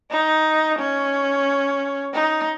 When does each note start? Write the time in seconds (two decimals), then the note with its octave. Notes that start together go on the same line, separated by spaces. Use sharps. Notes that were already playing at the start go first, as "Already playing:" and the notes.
0.11 D#4
0.79 C#4
2.14 D#4